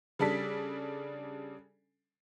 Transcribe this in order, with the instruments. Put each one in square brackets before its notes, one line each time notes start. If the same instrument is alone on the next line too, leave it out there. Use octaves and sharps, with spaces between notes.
[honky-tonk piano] C#3 G3 D4 A4 B6